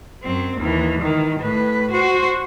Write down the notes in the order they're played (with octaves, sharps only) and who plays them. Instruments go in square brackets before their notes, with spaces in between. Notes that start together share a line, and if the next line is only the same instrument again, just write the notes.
[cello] F#2 C4
D#2 E3
D#3 E3
A2 B4
F#4 C5